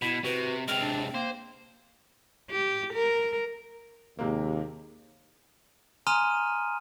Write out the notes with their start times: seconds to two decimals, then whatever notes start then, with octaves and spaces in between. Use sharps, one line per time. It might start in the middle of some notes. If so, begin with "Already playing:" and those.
0.02 B2 E4 B5
0.24 C3 F#4 B4
0.68 C3 G#3 C4 F6
0.82 D4
1.14 A#3 C5
2.50 G4
2.93 A#4
4.19 D#2 C3 G#3 A#3
6.07 G#5 A#5 C6 D#6 F6 D#7